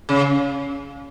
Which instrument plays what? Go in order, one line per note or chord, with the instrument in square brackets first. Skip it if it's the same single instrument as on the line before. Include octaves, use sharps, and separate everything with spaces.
[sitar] C#3